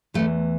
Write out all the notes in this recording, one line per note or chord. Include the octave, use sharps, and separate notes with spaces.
E2 E3 A3